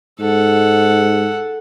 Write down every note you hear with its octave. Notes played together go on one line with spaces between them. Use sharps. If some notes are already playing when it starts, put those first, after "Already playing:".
G#2 A4 F#5